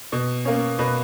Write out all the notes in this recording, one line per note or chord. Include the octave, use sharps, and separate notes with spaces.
B2
A#3 C#4
B2 B4